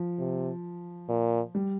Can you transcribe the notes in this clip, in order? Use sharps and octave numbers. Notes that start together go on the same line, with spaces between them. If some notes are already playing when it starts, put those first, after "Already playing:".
Already playing: F3
C3
A#2
G3